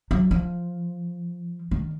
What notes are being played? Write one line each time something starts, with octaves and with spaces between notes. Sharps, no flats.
F#3
F3
D#3